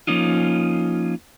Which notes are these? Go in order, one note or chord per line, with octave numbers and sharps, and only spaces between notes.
F3 A#3 C#4 D#4 F4